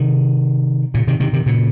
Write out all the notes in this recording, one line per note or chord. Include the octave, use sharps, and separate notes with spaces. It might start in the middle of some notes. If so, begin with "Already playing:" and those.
Already playing: C3 D#3
A#2 C#3
C3 D#3
C3 D#3
C3 D#3
A#2 C#3